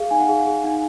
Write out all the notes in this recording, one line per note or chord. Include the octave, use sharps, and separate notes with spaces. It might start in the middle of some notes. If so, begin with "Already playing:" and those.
Already playing: G#4 F5
D#4 G#5
F#5
G#4 F5
F#5
G#4
D#4 F#5